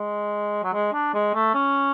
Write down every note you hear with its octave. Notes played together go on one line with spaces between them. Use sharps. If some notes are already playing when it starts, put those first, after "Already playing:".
Already playing: G#3
F#3
G#3
D4
G#3
A3
C#4